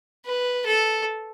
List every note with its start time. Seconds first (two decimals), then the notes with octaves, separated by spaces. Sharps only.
0.26 B4
0.66 A4